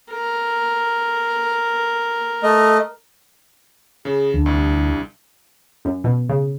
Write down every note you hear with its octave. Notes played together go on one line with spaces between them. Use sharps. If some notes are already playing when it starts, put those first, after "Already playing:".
A#4
A3 D#5
C#3 G#4
D2 D4
C2
F#2
B2
C#3